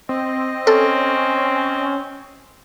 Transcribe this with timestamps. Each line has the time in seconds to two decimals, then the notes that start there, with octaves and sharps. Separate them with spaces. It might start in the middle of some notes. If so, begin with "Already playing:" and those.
0.09 C4 D#5
0.67 C4 C#4 A4